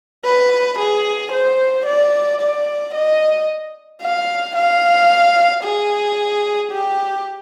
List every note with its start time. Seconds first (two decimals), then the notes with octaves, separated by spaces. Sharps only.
0.25 B4
0.79 G#4
1.32 C5
1.86 D5
2.41 D5
2.94 D#5
4.02 F5
4.56 F5
5.64 G#4
6.72 G4